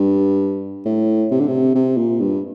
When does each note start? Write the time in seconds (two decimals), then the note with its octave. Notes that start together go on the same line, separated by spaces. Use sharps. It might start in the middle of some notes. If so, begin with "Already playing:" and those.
Already playing: G2
0.86 A2
1.31 C3
1.40 D3
1.48 C3
1.75 C3
1.97 A#2
2.20 G2